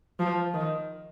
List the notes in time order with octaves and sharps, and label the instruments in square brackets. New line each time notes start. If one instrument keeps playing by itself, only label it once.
[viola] F3
D#3